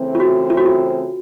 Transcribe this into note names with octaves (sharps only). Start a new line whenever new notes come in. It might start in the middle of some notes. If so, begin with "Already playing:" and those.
Already playing: C#3 E3 A3 C4
F4
F#4
F4
F#4
F4